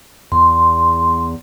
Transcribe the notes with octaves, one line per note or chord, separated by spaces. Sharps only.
E2 C6